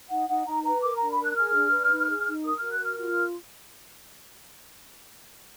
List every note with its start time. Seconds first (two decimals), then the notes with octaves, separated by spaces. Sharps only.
0.10 D#4 F#5
0.28 D#4 F#5
0.45 D#4 A#5
0.63 B4 A#5
0.82 A#4 D6
0.95 D4 A#5
1.09 B5
1.18 A#4 F#6
1.36 G#4 F6
1.54 D4
1.72 B4
1.90 D#4
2.08 G#4
2.27 D#4
2.44 A#4 D#6
2.58 F#4 F6
2.71 F#6
2.81 A#4 F6
2.98 F4 F6